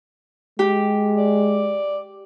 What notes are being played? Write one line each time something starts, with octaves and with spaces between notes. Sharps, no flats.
G#3 G4
D5